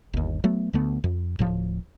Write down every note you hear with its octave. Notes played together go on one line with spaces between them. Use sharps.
G1 D#2
F#3 A3 B3
D2 D3 A3 B3
F2
D1 A2 F3